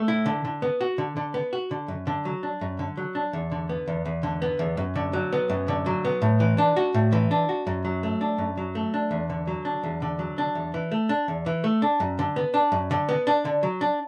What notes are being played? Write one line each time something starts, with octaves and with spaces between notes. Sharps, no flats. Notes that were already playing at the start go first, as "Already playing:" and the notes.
Already playing: A3
E4
D3
D3
B3
F#4
D3
D3
B3
F#4
D3
F#2
D3
F#3
D4
F#2
D3
F#3
D4
E2
D3
B3
E2
E2
D3
B3
E2
F#2
D3
F#3
B3
F#2
D3
F#3
B3
A2
E3
D4
F#4
A2
E3
D4
F#4
F#2
F#3
A3
D4
F#2
F#3
A3
D4
E2
D3
F#3
D4
E2
D3
F#3
D4
E2
E3
A3
D4
E2
E3
A3
D4
F#2
D3
B3
D4
F#2
D3
B3
D4
D3
F#3
D4